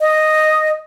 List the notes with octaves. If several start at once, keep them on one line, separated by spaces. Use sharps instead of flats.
D#5